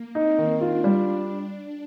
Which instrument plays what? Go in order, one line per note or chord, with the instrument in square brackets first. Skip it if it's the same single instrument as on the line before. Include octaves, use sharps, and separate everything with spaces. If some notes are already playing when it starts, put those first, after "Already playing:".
Already playing: [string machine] A#3
[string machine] C4 [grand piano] D#4
[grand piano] D#3
[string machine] D4 [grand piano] F4
[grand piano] G3